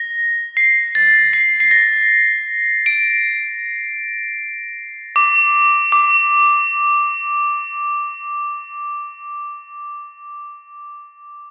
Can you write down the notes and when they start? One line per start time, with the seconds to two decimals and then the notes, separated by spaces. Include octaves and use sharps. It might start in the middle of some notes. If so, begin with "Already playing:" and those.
Already playing: A#6
0.57 C7
0.95 A6
1.33 C7
1.60 C7
1.71 A#6
2.86 D7
5.16 D6
5.92 D6